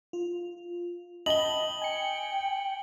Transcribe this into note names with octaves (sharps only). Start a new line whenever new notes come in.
F4
D#5 G5 A5 B5 F#7 G7
G5 G#5 C#7